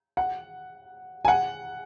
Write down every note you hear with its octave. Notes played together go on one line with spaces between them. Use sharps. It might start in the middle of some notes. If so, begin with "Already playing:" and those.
F#5
G#5
F#5